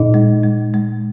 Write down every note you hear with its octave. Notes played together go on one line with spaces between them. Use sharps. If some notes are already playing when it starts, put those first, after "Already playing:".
Already playing: A#2 D#4 D#5
G#3
G#3
G#3